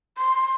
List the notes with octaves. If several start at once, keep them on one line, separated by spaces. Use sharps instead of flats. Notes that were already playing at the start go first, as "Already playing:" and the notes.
C6